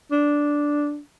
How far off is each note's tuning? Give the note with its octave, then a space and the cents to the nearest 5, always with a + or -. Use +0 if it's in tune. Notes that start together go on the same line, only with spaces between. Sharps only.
D4 -5